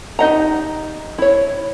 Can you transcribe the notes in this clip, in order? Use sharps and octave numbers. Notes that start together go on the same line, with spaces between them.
D#4 G4 D#5 F#5 A#5
E4 C#5